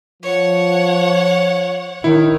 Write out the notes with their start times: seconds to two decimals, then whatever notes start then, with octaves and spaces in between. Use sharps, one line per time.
0.22 F3 C#5 F#5
2.04 D#3 D#4 E4